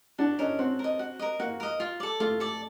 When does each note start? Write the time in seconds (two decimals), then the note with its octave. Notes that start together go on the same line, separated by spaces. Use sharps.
0.18 D4 F#4
0.39 C#4 A#4 D#5
0.59 C4 F#4
0.79 A#4
0.84 D#5
0.99 F#4
1.19 A#4 D#5
1.39 A#3 F#4
1.60 A#4 D#5
1.80 F4
2.00 A4 D5
2.20 A3 F4
2.40 A4 D5